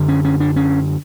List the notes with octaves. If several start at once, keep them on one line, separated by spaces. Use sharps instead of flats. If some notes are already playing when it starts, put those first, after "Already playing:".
Already playing: F#2 D3
C#4
C#4
D4
C#4